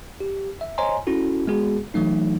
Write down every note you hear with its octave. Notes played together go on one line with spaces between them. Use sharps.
G4
E5
C5 C#5 D#5 G#5 A#5 C6
C#4 E4 F#4 A4
G#3 B3 F#4 G#4
E3 F#3 A3 D#4